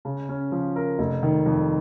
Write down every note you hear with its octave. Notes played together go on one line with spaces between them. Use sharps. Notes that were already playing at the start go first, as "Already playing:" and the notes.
C#3
C#4
F3
A#4
F1
D#3
F2